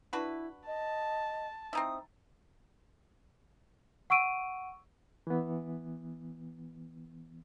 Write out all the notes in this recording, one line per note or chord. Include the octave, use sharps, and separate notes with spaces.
D4 E4 F#4 B4
D#5 A5
C4 D#4 E4 D#6
F#5 C#6 E6 D7 D#7
E3 B3